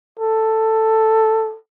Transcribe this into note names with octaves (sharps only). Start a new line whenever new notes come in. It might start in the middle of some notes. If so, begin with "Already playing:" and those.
A4